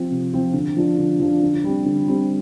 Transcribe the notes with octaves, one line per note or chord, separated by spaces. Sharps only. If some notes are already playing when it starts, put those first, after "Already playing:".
Already playing: F3 C4 F4
C3
F3 C4 F4
D3
F3 D4 F4
D3
F3 D4 F4
D3
G3 C4
D3
G3 C4